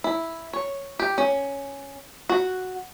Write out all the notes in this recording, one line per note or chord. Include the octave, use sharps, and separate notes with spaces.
E4
C#5
G4
C#4
F#4